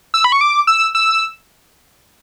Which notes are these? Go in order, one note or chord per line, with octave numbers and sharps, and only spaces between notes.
E6
B5
C#6
D6
E6
E6